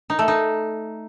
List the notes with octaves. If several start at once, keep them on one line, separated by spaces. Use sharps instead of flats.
D#4
A3
D#4